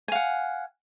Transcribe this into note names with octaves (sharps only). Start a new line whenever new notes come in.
F5 F#5 G#5